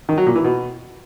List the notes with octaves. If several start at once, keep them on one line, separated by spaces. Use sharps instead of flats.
D#3
F#3
A#2
E3
B2